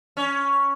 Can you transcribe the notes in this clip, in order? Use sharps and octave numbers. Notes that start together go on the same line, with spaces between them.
C#4